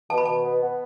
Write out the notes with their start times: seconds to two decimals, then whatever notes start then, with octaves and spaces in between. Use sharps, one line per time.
0.10 B2 A5
0.18 B5
0.25 B2 A5
0.44 B3
0.61 B3